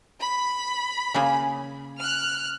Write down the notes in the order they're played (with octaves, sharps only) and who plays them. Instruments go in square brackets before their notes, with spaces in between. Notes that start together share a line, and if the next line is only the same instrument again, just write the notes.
[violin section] B5
[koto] C#3 A#3 G#4
[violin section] F6 F#6